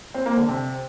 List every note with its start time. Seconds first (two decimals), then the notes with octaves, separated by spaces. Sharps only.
0.14 C4
0.26 A#3
0.37 D3
0.49 C3